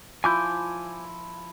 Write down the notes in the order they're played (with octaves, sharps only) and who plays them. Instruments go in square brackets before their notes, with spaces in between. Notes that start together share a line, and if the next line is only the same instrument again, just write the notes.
[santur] F3 E4 [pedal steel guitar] G#5 D6 G6